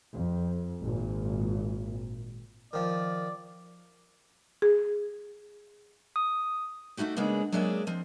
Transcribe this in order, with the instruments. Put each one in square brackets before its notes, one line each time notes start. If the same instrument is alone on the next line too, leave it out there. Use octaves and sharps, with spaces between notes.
[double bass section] F2
G#1 A#2
[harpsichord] D#3 F3 [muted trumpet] D5
[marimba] G#4
[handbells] D#6
[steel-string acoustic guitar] A3 A#3 D#4 F#4 G4
C#3 G#3 A#3 B3 D4
F#3 G#3 A#3 D4 G#4 E5
F3 C4